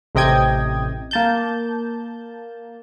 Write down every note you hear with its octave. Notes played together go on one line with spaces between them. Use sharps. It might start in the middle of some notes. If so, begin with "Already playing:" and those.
A1 C3 D#5 G5 G#6
A#3 A5 G6